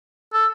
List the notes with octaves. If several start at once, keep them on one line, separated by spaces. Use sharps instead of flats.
A4